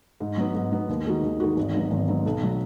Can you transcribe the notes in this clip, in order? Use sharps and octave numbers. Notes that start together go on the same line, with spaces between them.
G#2
F#3 B3
G#2
F#3 B3
D#2
D#3 G#3 D#4 F#4
D#2
D#3 G#3 D#4 F#4
G#1
G#2 F#3 B3
G#1
G#2 F#3 B3
B1
B2 F#3